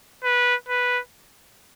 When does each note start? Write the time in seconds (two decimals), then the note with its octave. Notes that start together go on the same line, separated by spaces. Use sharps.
0.24 B4
0.69 B4